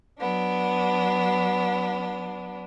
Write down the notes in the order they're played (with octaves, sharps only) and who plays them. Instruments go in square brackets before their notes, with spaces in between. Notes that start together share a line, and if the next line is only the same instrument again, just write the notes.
[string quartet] F#3 B3 D4